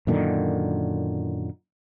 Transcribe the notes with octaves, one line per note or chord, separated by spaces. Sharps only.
F#2 A#2 D3 D#3